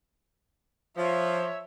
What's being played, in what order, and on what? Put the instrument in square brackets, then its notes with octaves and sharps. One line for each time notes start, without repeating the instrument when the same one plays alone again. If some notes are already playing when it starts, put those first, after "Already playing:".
[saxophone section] F3 [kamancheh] C#5 E5